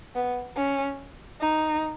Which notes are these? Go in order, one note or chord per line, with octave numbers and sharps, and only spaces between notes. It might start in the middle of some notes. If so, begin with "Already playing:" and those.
B3
C#4
D#4